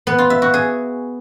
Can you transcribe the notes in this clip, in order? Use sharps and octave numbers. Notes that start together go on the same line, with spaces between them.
B3
F4
E5
F#4
G#4